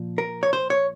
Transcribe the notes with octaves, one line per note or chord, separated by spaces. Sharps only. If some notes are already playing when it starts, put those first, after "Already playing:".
Already playing: A#2 F3
A#4
C#5
C5
C#5